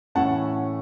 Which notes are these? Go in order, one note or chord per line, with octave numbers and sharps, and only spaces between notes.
A2 E3 A3 C#4 F#5 A5
F#5